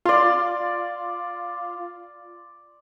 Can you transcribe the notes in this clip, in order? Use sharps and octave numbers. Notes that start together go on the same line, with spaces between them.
F4 D5 C6